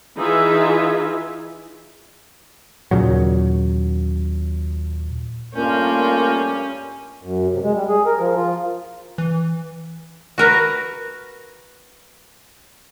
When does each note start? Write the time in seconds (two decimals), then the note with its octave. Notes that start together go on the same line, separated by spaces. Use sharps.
0.17 E3 D#4 F4 G#4 E5
2.91 D#2 A#2 C#3 F#3
5.54 G2 A3 A#3 C#4 F4 A#4 G6
7.23 F#2
7.52 C3
7.63 G#3
7.75 G3
7.89 G#4
8.06 A#4
8.19 F3
8.36 F4
9.18 E3
10.38 F#4 A#4 B4